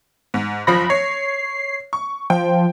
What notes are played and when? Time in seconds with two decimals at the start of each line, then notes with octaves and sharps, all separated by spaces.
0.34 G#2
0.67 F#1 F3 B5 A#6
0.90 C#5 C7
1.93 C#6
2.30 F3 G5